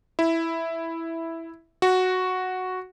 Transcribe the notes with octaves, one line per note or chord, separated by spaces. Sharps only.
E4
F#4